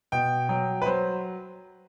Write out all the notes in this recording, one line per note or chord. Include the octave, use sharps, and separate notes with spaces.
B2 G5
F#3 G5
B4
F#3 C5